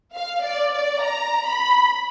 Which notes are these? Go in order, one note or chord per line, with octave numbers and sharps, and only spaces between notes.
F5
D5
D5
A#5
B5